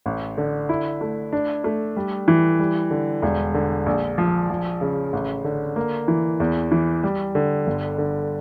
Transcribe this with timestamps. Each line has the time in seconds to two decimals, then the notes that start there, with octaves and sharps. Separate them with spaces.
0.06 A1
0.38 D3
0.69 E4
1.01 A3
1.33 D4
1.64 A3
1.97 G3
2.28 E3
2.59 G3
2.91 D3
3.22 E1
3.54 D3
3.86 A#1
4.18 F3
4.50 F3
4.81 C#3
5.13 A1
5.45 D3
5.76 A#3
6.08 E3
6.40 E2
6.71 E3
7.03 G3
7.35 D3
7.67 G1
7.98 D3